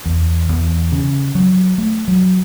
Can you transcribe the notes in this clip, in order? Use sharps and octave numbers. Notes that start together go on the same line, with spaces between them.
E2
E2
C#3
F#3
A3
F#3